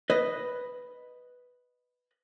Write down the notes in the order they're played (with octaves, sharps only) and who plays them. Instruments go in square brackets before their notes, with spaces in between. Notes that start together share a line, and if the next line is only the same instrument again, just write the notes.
[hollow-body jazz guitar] B4 D#5